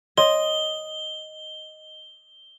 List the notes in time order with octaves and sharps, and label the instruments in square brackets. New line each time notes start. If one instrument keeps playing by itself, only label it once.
[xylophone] C#5 C6 [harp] D#5 [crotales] G7